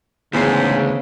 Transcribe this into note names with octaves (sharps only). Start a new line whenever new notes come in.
D2 G#2 C#3 E3 B3 C5 C7